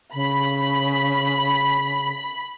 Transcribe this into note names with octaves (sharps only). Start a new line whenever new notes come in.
C#3 B5